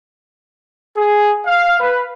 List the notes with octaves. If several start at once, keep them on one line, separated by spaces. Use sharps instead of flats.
G#4
F5
B4